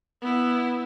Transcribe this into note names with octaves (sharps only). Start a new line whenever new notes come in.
B3 E4